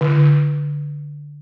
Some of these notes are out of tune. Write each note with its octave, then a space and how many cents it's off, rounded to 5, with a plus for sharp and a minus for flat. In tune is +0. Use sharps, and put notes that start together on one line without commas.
D3 -5